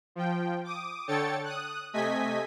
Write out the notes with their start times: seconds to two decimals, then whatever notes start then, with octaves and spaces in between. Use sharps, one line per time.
0.15 F3 G5
0.64 D6 D#6
1.08 D3 A4 C#5 G5 A6 C#7
1.44 D#6 F#6
1.93 C3 A3 D#5 G#5 G#6 B6